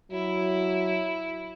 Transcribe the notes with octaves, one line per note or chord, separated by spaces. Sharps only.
F#3 E4